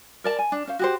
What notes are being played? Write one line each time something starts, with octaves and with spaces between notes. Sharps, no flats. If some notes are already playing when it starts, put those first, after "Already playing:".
A#4 D5 A5
G#5
D4
C#4 C5 F5
F#4 G4 C5